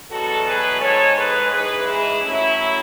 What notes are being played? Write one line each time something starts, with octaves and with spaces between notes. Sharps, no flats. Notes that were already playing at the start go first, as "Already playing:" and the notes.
E2 B2 F#3 F#4 A4
G#4 B4
G#2 G#3 A4 C#5
G#4 B4
G#2 E3 G#3 G#4 B4
E4 G#4
A2 F#3 C#4 E4